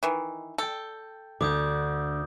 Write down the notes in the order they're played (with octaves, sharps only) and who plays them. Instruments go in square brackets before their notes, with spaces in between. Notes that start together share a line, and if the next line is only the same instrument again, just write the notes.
[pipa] D#3 E3
[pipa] A4 [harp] G5 G6
[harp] D2 [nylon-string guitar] D3 [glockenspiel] D6 D#6 G6